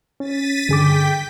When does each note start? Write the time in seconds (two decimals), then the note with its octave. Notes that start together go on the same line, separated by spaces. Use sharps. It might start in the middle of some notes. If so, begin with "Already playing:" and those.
0.20 C#4 A6 B6 D#7
0.69 G2 D3 G#4 G5 D6 B6